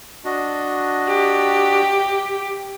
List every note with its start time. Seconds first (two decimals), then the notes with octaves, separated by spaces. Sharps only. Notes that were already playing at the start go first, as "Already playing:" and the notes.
0.25 D4 F#4 D#5
1.08 G4